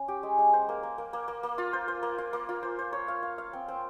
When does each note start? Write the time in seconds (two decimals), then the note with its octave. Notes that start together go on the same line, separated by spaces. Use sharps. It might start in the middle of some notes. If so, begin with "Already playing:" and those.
Already playing: C#4
0.08 G4
0.23 G#3
0.39 G#3
0.53 C5
0.69 A#3
0.83 A#3
0.98 A#3
1.13 A#3
1.28 A#3
1.43 A#3
1.58 F4
1.73 C5
1.88 C5
2.03 A#3
2.18 F4
2.33 A#3
2.49 F4
2.63 C5
2.79 C5
2.93 C#5
3.08 F5
3.23 F5
3.38 F5
3.53 C4
3.68 C4